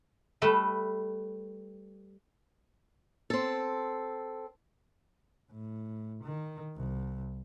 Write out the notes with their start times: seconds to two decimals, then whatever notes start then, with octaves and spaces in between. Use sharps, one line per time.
0.42 G3 A3 B4 E5
3.30 C4 A4
5.52 A2
6.24 D#3
6.76 C2